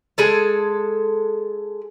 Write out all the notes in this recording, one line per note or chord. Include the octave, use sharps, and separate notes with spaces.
G#3 G#4 A4